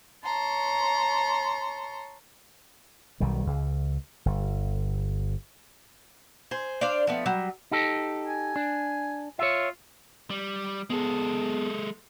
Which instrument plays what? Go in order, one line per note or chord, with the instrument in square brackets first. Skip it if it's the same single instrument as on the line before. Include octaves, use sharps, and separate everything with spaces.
[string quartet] C#5 A5 A#5 C6
[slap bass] B1 D#3 G3
C#2
G1
[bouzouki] G#4 C5
D4 C5 D5 F5
F3 A3 B3
F#3 G3
[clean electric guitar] D#4 G4 A4
[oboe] G#5
[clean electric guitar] D4
[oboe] F4 [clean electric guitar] C#5 E5
[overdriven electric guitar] G3
[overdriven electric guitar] G#3 A4 [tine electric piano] B3 G#4